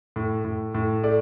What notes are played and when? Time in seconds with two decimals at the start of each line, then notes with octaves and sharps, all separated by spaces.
0.16 A2
0.44 A2
0.74 A2
1.04 A3 D5